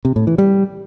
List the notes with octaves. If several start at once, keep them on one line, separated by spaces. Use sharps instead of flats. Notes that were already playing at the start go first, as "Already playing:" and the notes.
C3
A2
E3
G3